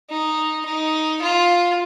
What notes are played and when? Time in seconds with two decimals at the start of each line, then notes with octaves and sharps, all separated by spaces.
0.10 D#4
0.65 D#4
1.21 F4